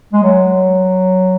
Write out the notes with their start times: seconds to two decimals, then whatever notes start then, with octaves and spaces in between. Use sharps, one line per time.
0.13 G#3
0.23 F#3